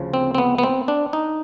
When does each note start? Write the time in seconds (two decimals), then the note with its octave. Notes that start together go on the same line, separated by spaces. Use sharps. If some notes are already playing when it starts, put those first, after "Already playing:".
Already playing: D2 C#3 F3
0.14 C4
0.35 C4
0.38 B3
0.58 B3
0.63 C4
0.88 D4
1.13 D#4